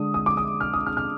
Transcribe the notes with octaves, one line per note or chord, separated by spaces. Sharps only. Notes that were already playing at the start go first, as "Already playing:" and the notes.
Already playing: D3 G#3 D4 D#6
D#6
D6
D#6
F6
D#6
F6
F6